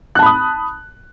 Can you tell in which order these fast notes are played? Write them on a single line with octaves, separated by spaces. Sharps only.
F#6 A5 B5 D#6